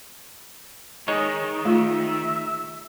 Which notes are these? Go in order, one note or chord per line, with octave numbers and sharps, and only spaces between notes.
D#3 G#3 D#4 C#5 D#5
A3 F4 E5